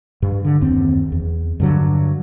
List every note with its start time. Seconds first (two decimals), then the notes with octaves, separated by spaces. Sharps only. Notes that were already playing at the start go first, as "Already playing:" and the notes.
0.22 G2
0.44 D3
0.61 F#1 D#2 C4
1.12 E2
1.60 G2 D3 F#3